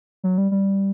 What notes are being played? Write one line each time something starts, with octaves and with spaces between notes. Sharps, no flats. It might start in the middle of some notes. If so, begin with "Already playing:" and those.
F#3
G3
G3